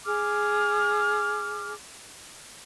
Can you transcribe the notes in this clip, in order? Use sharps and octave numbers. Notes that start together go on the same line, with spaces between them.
G#4 D6 F6